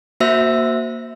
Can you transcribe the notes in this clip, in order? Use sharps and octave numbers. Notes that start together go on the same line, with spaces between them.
A#3 F#4 C5 E5 E6 A#6